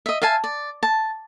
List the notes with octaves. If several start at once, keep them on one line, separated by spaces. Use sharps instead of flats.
D#5 E5
E5 F5 G#5 A5
D5
A5